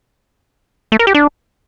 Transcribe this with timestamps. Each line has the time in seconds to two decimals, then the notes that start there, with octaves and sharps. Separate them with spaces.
0.92 A3
0.99 A#4
1.07 G4
1.14 D4